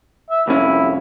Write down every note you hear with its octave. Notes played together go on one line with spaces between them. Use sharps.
E5
C2 F2 C#4 E4